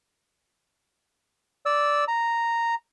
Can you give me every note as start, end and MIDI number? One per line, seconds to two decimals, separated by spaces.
1.66 2.04 74
1.66 2.04 88
2.08 2.75 82